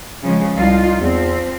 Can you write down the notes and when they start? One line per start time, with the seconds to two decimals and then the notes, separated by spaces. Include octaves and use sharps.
0.23 C#3 F3 G#3
0.55 C2 D#4 F4
1.00 E2 F3 C4